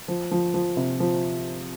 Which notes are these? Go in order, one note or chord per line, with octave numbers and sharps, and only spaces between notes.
F3
F3
F3
C3
F3